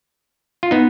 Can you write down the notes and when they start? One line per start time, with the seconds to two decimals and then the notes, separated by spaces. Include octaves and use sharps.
0.63 F4
0.71 B3 D#4